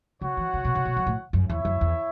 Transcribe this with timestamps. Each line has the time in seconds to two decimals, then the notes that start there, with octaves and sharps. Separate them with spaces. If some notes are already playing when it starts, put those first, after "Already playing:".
0.21 C#3 F#4 C#5 F#5
0.37 E3
0.53 C#3
0.65 B2
0.75 C#3
0.85 B2
0.96 F#2
1.07 A2
1.33 F#2
1.49 E2 E4 C#5 E5
1.65 F#2
1.81 E2